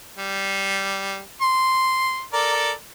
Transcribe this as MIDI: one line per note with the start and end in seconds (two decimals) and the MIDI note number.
0.18 1.19 55
1.41 2.21 84
2.33 2.72 69
2.33 2.72 70
2.33 2.72 74